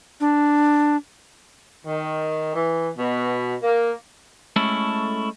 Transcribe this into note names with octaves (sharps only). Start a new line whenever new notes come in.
D4
D#3
E3
B2
A#3
G#3 A3 C#4 E4 A4